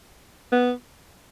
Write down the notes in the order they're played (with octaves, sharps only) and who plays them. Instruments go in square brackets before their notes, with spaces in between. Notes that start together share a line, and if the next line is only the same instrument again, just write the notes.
[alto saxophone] B3